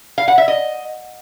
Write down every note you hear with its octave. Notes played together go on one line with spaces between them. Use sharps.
F5
F#5
E5
D#5